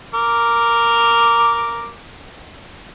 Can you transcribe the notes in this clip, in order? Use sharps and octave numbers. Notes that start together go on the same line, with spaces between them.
A#4 D6